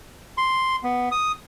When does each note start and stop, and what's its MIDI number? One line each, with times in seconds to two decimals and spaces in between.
0.38 0.76 84
0.83 1.09 59
1.11 1.32 87